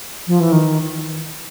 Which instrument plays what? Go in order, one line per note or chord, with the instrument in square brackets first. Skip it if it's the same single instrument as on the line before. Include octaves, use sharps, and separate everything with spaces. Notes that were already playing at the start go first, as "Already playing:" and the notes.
[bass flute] F3
E3
D#3